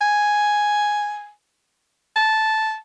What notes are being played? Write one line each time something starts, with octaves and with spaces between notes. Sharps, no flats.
G#5
A5